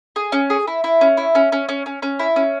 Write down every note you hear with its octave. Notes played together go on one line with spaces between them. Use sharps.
G#4
C#4
G#4
E4
E4
C#4
E4
C#4
C#4
C#4
C#4
C#4
E4
C#4